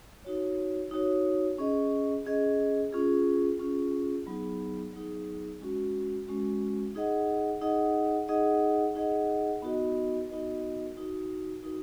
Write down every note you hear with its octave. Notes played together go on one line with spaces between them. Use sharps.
D#4 F#4 C#5
D#4 F#4 C#5
C#4 G#4 D#5
C#4 G#4 D#5
C#4 F4 G#4
C#4 F4 G#4
F#3 B3 D#4 G#4
F#3 B3 D#4 G#4
G#3 C#4 F#4
G#3 C#4 F#4
D#4 G#4 D#5 F#5
D#4 G#4 D#5 F#5
D#4 G#4 D#5 F#5
D#4 G#4 D#5 F#5
B3 D#4 F#4 A#4 D#5
B3 D#4 F#4 A#4 D#5
D#4 F#4 A#4
D#4 F#4 A#4